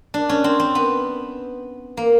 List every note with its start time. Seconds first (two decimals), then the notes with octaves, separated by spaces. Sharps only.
0.14 D4
0.29 C#4
0.44 C4
0.60 C4
0.75 B3
1.97 A#3